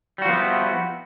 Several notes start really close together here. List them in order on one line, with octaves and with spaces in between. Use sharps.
G3 F#4 F3 B3 E4